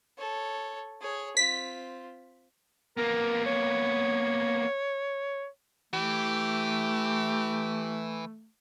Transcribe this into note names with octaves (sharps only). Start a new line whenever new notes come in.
A4 C#5
G#4 C#5
C4 F4 B6
A#3 B3 A#4
C#5
E3 A3 G4